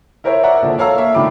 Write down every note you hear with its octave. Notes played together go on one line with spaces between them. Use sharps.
E4 A#4 C5 C#5 E5
C5 D5 E5 F#5 A#5
A#1 D3 A4
A4 C#5 F5 A5 A#5 E6
A#3 E5
D3 D#3 A3 B5 D6